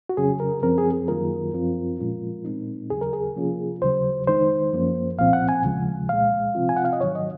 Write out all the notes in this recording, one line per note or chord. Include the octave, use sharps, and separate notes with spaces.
F#4
F2 C#3 F#3 C#4 G#4
A#4
F#2 F3 C4 A#4
G#4
G#4
F#2 D#3 F#3 A#3 F4 A#4
F#2 F3 C4 F4
A#2 F3 G#3 C#4 F4
A#2 G#3 C4 D#4
D#2 C#3 F#3 G#4
A#4
G#4
C3 F3 A#3 C#4 F4
D#2 C#3 F#3 C5
F2 D#3 G#3 D#4 C5
F#2 F3 A#3 C#4
C2 A#2 F3 C4 F5
F#5
G#5
D#2 C#3 F3 G#3
C2 A#2 G#3 F5
C3 F3 C4 F4
G#5
F#5
F5
D#5
G#2 D#3 F#3 C#5
D#5